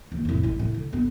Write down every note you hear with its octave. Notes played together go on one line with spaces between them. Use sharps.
D#2
F2 A2
A1 E4
A2
D3
G1 B3